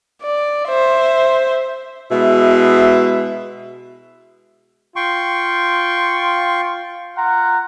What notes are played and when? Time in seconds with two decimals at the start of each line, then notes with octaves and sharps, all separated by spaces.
0.23 D5
0.68 C5 E5
2.11 B2 G#3 E4 E5
4.96 F4 G5 C6 C#6
7.16 F4 F#5 A#5